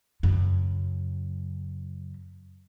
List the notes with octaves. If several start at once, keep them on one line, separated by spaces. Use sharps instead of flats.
F#2 C#3